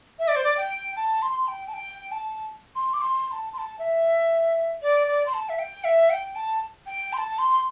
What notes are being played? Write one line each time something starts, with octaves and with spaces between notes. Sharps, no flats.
E5
D5
C5
D5
G5
A5
C6
G5
A5
G5
A5
C6
D6
C6
C6
A5
C6
A5
E5
D5
D5
C6
A5
E5
G5
E5
G5
A5
G5
C6
A5
C6